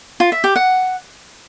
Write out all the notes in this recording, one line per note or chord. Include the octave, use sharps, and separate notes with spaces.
F4
E5
G4
F#5